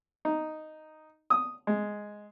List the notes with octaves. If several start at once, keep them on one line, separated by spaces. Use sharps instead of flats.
D#4
D#6
G#3